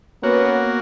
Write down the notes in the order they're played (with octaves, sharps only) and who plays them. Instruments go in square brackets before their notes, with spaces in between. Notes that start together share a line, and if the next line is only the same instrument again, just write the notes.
[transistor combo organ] A#3 F#4 [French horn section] B3 [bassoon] C#4